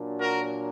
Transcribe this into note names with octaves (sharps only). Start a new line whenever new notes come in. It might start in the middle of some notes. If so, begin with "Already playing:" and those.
Already playing: A#2 F#3 D4
F#4 A#4